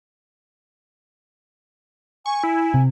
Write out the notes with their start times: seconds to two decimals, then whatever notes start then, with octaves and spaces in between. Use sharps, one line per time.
2.26 G#5 C#6
2.43 E4
2.74 C3